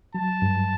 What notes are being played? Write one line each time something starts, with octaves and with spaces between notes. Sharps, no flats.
F#3 A5
G2